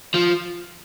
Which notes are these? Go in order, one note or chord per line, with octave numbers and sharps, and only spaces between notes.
F3